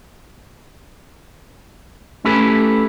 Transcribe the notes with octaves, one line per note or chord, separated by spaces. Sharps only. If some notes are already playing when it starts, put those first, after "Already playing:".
A3 C#4 E4 G4 A4 B4